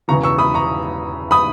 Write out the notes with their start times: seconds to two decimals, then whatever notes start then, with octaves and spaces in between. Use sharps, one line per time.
0.08 E1 E2 C#3 E3 A#5 C#6
0.23 C#6 E6
0.38 B5 D#6
0.54 A#5 C#6
1.31 B5 D#6